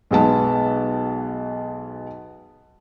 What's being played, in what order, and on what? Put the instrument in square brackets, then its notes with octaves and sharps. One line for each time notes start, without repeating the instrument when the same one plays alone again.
[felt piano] B1 G#3 B3 A5